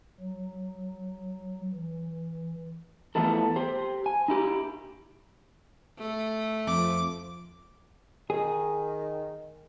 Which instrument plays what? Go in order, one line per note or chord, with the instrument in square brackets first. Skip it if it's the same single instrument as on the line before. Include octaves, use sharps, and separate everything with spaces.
[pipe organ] F#3
E3
[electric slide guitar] E3 F3 A3 B3 E4 A4
G4 C5
G#5
D#4 E4 G4
[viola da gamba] A3
[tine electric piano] F2 [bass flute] F3 [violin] D6
[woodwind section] D#3 [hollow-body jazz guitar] G#4